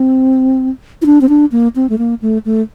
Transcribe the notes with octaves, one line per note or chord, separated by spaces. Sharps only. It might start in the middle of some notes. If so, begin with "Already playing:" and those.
Already playing: C4
E4
D4
C4
D4
A#3
C4
A3
A#3
A3
A3